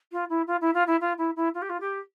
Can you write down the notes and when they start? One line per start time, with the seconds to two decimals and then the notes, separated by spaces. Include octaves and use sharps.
0.12 F4
0.30 E4
0.47 F4
0.61 E4
0.74 F4
0.87 E4
1.01 F4
1.18 E4
1.36 E4
1.54 F4
1.62 G4
1.70 F4
1.81 G4